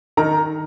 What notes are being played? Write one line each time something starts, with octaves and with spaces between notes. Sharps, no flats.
D#3 A#5